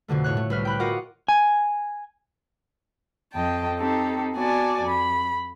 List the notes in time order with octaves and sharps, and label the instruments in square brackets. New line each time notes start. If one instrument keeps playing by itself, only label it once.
[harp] F2 B2 D3 A3
A2 C#5 F#6
A3
C2 B4 F6
G5 B5 F#6
F4 F#4 A#4 D#5 F#5 D6
[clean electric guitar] G#5
[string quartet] F2 D#5 G5 A5
C4 D#4 G4 A4
B3 F#4 D5 G#5 A5
F2 B5